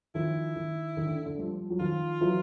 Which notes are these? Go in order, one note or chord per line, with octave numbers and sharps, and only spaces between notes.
D#3 F3 E4
D#3
D#3
D3
D3
F3 G3
F#3
D#3 F3 F4
E3 F#3